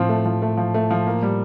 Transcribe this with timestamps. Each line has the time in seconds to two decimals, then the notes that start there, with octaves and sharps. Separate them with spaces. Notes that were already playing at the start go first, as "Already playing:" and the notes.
Already playing: A2 F3 C4
0.09 A3
0.25 F3
0.42 A3
0.57 F3
0.74 A3
0.91 F3
1.07 A#3
1.22 G3